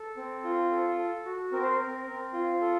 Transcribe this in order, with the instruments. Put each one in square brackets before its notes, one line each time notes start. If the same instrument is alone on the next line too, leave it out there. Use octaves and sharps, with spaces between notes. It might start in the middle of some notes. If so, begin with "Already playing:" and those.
Already playing: [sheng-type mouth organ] A4
C4
F4
A4
A4
F#4
C4 A#4
C5
A#4
C4
C4
F4
A4